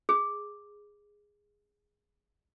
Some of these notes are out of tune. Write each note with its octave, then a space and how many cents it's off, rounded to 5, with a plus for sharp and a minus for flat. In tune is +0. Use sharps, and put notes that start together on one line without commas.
G#4 -5